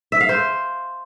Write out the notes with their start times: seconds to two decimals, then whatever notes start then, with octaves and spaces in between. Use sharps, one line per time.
0.12 E5
0.21 F5
0.29 C5